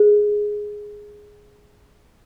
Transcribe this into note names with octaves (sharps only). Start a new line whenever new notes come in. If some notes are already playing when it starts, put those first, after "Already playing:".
Already playing: G#4